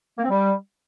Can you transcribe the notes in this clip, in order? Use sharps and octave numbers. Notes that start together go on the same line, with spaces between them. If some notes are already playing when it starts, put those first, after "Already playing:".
A#3
C4
G3